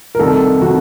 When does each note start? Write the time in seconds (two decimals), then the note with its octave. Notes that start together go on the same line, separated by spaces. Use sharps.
0.15 A#4
0.19 C2 C3 D#3 A4
0.61 C3 D#3 F#4